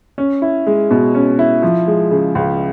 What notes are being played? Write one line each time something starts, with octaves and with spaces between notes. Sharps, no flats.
C#4
E4
G#3
B2
C#4
E4
F3
G#3
C#3
C#2